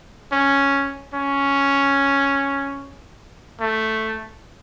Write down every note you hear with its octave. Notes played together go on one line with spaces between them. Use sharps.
C#4
C#4
A3